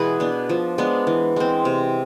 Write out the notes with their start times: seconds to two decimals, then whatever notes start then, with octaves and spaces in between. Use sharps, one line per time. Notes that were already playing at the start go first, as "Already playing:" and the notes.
Already playing: B2 E3 G#3 G#4 B4
0.20 B3 D4
0.49 F3
0.78 G#3 B3 D4
1.07 E3
1.36 G#3 C4
1.65 C3